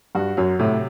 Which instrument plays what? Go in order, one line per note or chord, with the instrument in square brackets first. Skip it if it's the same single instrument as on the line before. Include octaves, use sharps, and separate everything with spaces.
[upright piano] G2 [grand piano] F#4
[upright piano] F#2 [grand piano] F#3
[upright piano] A2 [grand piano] C3